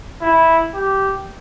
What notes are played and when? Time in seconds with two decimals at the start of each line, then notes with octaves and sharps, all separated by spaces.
0.21 E4
0.74 G4